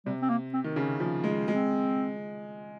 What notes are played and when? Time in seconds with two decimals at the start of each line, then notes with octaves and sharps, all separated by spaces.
0.06 C3 G3
0.22 C4
0.30 A#3
0.53 C4
0.64 D#3
0.76 C#3 C#4
1.00 F3
1.24 G#3
1.48 G#3 C4